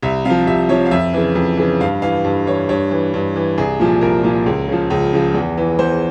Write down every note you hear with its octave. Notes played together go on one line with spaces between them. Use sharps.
C2 E5
C3 F3 F5
C2 E5
C3 F3 C#5
F5
F2 E5
C#3 E3
F2
C#3 E3
G2 F5
E3 F5
G2
E3 C#5
G2 C#5
E3
G2
E3
C2 G#4
A#2 F3
C2 A#4
A#2 F3
C#2
C#3 F3
C#2
C#3 F3
E2
E3
E2 C5